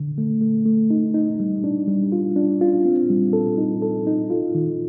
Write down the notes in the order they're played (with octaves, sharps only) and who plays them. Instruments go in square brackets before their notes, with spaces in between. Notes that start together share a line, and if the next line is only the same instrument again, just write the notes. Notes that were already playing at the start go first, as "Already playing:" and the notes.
Already playing: [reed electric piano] D3
A3
A3
A3
D#4
D#4
G3
D4
G3
F4
D4
F4
C4
G3
A4
D#4
A4
D#4
F4
D#3